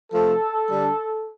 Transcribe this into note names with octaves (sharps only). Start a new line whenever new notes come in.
C3 F3 A3 A4
D3 G3 D4